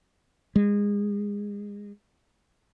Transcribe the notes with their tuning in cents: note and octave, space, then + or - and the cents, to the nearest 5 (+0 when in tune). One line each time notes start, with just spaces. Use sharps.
G#3 -25